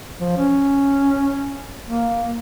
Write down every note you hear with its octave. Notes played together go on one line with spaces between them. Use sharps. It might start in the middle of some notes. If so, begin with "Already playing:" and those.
F3
C#4
A#3